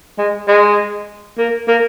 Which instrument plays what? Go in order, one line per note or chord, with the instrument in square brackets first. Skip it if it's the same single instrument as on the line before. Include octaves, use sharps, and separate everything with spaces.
[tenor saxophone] G#3
G#3
A#3
A#3